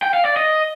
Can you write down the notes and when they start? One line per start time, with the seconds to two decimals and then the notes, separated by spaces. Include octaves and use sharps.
0.03 G5
0.14 F5
0.25 D5
0.37 D#5